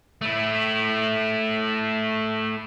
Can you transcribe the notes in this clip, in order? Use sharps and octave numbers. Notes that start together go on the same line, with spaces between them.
A3 E4